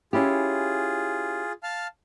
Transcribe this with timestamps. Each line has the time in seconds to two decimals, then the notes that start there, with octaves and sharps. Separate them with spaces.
0.13 C#4 E4 F4 G4 G#4
1.63 F5 A5 F6